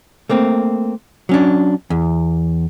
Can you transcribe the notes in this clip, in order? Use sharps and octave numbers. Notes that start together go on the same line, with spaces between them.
A3 A#3 C4
F#3 C#4 D4
E2